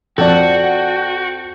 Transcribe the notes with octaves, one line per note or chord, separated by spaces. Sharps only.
F2 F#4 A4 D5 G5 A5